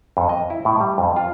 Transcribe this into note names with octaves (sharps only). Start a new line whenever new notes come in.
F2
D#5
E4
A2
G3
F2
F4